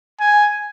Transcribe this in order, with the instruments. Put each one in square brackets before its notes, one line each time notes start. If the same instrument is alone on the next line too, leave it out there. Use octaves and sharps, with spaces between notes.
[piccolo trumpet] G#5